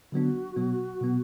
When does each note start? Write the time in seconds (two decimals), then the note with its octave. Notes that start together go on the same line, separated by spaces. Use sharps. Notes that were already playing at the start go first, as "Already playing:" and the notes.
0.12 D3 F#3 B3 D4 F#4
0.56 B2 F#3 B3
1.01 B2 F#3 B3